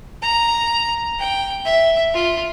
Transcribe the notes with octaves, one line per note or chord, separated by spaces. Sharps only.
A#5
G5
E5
F4